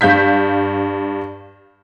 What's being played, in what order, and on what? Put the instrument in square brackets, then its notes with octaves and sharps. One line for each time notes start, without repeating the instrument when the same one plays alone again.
[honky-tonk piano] G2 F5 G6 B6